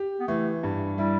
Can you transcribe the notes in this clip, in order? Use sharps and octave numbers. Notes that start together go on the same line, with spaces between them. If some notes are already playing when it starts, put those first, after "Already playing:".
Already playing: G4
B3
E3 A3
G2
G3 E4